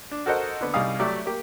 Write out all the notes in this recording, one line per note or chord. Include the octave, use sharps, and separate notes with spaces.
D4
F#4 A4 A#4 C5 D#5 F#5
D3 B3
C2 G3 D#4 G#4 F5 D#6
F#3 A3 G4 D5 E5
A#3 G4